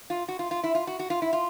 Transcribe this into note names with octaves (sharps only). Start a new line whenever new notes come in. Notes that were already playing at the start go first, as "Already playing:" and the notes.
F4
F#4
F4
F4
E4
F4
F#4
F#4
F4
E4
F4